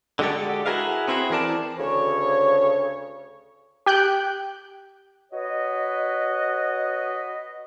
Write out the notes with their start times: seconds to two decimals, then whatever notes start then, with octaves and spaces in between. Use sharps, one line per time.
0.19 D3 G#3 F#4 G4 A4
0.66 E4 F#4 G#4 A#4 B4 F5
1.08 B3 C4 E4 F#4 G#4
1.30 E3 C4 A#4 D5 A5
1.79 D2 C#3 C#5
3.86 G4 G5 F#6 G6
5.32 F#4 B4 C#5 D#5